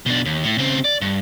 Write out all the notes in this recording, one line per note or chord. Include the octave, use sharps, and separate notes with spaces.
B2 D4
D#2
A2
C#3 C4
D5
G2